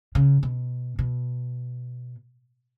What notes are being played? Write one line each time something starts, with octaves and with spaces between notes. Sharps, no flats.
C#3
B2
B2